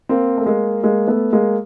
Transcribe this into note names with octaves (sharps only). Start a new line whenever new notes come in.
A#3 C4
A3
G#3 A#3
G#3 A#3
A3 B3
G#3 A#3